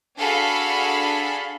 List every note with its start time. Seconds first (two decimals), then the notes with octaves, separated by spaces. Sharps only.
0.18 D4 F#4 G#4 A4 F5 B5